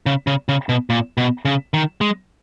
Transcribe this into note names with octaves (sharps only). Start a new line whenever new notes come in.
C#3
C#3
C#3
B2
A#2
B2
C#3
D#3
G#3